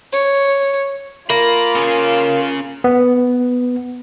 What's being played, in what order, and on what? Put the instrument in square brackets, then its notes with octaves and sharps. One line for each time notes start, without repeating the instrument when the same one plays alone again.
[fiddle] C#5
[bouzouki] A#3 [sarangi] F4 [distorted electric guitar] B5
[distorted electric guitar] C#4 G#4
[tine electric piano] B3